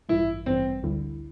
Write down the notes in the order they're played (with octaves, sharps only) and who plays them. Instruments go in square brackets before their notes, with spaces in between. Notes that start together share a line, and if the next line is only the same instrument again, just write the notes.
[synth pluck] A1 G2 E3 G3 [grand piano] E4
[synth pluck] A1 G2 E3 G3 [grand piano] C4
[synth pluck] D2 D3 G3 E4